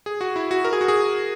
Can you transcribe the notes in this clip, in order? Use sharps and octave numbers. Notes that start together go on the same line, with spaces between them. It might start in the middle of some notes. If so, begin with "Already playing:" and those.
G#4
F#4
E4
F#4
A#4
G#4
F#4
G#4